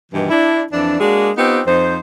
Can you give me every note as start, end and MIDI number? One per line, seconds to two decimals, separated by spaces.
0.12 0.28 43
0.12 0.28 47
0.12 0.28 51
0.12 0.28 52
0.29 0.62 62
0.29 0.62 64
0.71 0.97 41
0.71 0.97 52
0.71 0.97 62
0.99 1.29 56
0.99 1.29 58
0.99 1.29 62
0.99 1.29 66
0.99 1.29 68
1.36 1.60 59
1.36 1.60 60
1.36 1.60 63
1.36 1.60 65
1.36 1.60 67
1.66 1.96 41
1.66 1.96 63
1.66 1.96 72